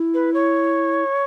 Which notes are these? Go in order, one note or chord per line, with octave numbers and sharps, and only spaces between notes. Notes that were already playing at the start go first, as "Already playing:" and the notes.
Already playing: E4
B4
C#5